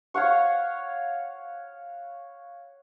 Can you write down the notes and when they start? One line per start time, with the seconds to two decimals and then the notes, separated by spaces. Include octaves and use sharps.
0.14 C#5 F5 F#5 C#6